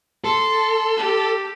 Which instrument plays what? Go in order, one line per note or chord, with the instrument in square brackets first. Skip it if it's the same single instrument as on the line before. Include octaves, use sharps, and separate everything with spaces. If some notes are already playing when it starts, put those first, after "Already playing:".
[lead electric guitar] A4 [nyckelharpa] C6
[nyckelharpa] G4